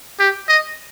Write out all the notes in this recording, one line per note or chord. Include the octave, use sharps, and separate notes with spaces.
G4
D#5